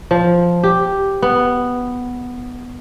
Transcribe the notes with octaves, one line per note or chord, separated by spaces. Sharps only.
F3
G4
B3